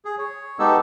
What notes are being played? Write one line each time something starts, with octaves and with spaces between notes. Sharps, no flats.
G#4
C#5
G#3 B3 D#4 G4 A4 E6